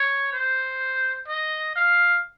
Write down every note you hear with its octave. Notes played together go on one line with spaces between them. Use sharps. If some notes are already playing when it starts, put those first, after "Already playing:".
Already playing: C#5
C5
D#5
F5